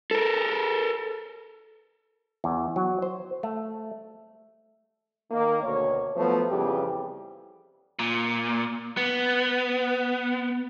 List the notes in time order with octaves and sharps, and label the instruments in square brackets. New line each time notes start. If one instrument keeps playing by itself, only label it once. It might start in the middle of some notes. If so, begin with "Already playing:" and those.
[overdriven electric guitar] A4 A#4
[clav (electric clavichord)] E2
F#3
C5
A3
[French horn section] D#3 A#3
D2 B2 C#5
F3 F#3 A3 B3
F2 C#3 E3 G3 B3 G4
[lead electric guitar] A#2
B3